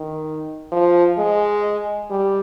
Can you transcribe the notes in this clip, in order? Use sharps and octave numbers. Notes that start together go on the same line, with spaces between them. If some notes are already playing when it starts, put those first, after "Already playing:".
Already playing: D#3
F3
G#3
G3